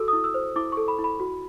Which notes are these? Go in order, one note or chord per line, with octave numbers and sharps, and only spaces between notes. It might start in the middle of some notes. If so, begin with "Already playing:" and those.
Already playing: F#4 A4 E6
D#6
E4
E6
C5
E4 D6
A4 C#6
B5
E4
B5
F#4